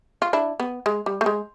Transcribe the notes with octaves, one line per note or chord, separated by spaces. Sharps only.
F4
D4 E4
B3
G#3
G3
A3
G#3